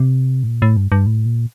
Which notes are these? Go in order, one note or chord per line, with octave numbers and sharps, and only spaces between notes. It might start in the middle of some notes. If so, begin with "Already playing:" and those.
Already playing: C3
A2
A#2
A2
G2
G2
A2
A#2